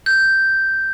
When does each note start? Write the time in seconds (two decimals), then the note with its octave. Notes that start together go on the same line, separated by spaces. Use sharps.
0.06 G6